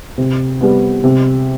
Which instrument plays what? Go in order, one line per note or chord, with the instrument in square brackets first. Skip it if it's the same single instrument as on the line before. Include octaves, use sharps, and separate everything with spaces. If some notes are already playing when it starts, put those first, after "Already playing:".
[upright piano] C3
G3 B3
C3